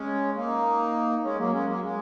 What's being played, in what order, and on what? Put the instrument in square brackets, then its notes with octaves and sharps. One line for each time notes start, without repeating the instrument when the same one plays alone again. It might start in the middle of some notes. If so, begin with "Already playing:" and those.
Already playing: [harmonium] G#3 C#4
A#3 D#4
G#3 C#4
F#3 A#3
G#3 C#4
F#3 A#3
G#3